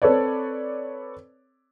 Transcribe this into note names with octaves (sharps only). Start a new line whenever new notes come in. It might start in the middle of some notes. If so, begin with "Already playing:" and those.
C4 A4 B4 C#5 D5